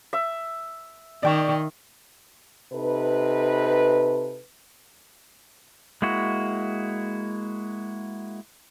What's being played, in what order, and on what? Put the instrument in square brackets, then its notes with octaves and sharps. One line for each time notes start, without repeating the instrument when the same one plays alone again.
[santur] E5
[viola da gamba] D#3 [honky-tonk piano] D5 G5 C#6
[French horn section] C3 D#4 A4 B4
[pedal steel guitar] G#3 A#3 E4 F#4